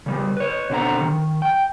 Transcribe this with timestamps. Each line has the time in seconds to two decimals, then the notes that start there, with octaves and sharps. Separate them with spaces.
0.06 C#3 G3
0.37 B4 C#5
0.70 B2 D3 C4 B4 F#5 A#5
1.01 D#3
1.42 G5